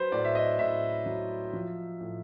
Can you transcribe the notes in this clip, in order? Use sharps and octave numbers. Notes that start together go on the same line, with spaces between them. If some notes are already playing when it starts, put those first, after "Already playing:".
Already playing: F#3 B4 C5
A2 D5
E5
D#5
A2 E5
F#3
F3
A2